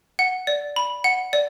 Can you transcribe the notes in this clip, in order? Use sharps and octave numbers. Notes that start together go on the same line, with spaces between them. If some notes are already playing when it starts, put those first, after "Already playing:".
F#5
D5
B5
F#5
D5